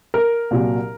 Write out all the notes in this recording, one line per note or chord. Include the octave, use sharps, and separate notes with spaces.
A#4
C2 A#2 F#3